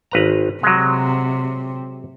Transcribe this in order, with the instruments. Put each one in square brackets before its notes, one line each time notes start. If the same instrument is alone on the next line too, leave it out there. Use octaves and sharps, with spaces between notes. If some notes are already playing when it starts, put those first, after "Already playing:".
[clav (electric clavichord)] G#1 B4 A#5
[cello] C3 [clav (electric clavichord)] F#3 G#3